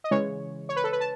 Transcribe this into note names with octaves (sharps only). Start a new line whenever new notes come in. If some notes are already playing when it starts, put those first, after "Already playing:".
D#5
C#3 E3 G#3 C#5
C#5
B4
A4
B4
A5